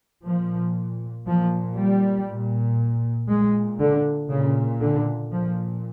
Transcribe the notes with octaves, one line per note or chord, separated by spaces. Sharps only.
A#2 F3
A#2 F3
G3
A#2
A#2 G#3
D3
A#2 C#3
D3
A#2 F3